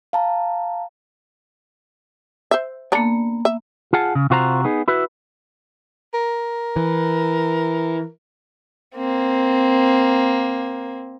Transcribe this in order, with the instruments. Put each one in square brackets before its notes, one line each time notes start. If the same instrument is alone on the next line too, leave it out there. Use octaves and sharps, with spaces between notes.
[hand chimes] F5 A5 A#5
[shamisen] C5 E5
[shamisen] D3 D4 A#5 [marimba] A#3 B3
[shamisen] E5
[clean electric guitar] F4 G#4 F#5 A5
C#3
C3 F4 F#4 C5 F5 A#5
B3 D#4 G#4
E4 F#4 B4
[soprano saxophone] A#4
[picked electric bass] E3
[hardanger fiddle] A#3 C4